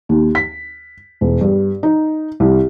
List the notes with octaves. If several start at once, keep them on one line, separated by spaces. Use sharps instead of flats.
D#2
B6
E1
G2
D#4
C2